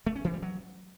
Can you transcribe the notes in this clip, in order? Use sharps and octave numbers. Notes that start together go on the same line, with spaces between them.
A3
C#4
E3
G3
F#3